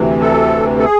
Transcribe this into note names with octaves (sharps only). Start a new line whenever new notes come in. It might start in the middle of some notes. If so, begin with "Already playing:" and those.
Already playing: D2 C3 E3
A4
A4
G#4